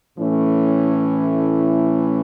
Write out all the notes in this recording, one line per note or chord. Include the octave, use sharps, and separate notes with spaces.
A2 E3 A3 C#4 E4